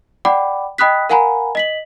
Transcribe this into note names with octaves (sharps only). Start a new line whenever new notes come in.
D5 F#5 G5 B5 D6
D#5 G5 B5 D#6 F#6 B6
A#4 F5 F#5 G#5 A#5 B5
D#5 B6 F#7